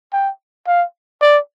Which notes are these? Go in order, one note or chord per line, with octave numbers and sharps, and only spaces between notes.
G5
F5
D5